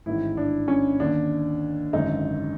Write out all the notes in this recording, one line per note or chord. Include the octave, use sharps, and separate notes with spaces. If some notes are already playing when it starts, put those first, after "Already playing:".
A1 G#2 D#3 E4
D4
C#4
D#2 D3 D4
G#1 F#2 D3 D#4